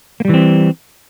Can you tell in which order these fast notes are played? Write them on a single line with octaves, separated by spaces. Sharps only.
A#3 G3 E3 C4